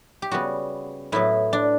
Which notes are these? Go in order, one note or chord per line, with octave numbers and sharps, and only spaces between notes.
G4
C#3 G3 B3 F#4
A2 F#3 B3 E4
D4